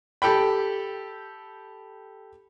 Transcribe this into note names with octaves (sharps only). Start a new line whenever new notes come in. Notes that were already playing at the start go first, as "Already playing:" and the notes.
G4 A4 G5 B5